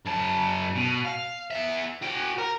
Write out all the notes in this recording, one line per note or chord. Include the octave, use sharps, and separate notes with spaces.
F#2 A5
B2
F5
B3 E5
F#4 G5
A#4